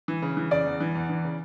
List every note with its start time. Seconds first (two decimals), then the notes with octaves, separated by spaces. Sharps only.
0.08 E3
0.22 C#3
0.37 E3
0.51 C#3 D5
0.65 E2
0.80 E3
0.95 E2
1.10 E3
1.25 C#3